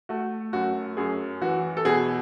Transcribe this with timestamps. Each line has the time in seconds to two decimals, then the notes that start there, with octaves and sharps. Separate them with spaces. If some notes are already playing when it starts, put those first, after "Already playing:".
0.09 A3 F#4
0.53 F#2 F#4
0.97 F#2 G#4
1.42 E3 F#4
1.77 A4
1.85 B2 G#4